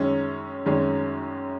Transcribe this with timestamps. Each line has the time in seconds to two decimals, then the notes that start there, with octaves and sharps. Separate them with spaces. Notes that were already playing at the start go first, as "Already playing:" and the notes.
Already playing: F#2 D#3 G#3 C#4
0.66 F#2 D#3 G#3 C#4